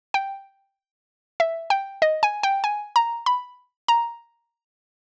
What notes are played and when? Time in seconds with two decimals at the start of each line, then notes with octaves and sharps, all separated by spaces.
0.14 G5
1.40 E5
1.70 G5
2.02 D#5
2.23 G#5
2.43 G5
2.64 G#5
2.96 A#5
3.26 B5
3.88 A#5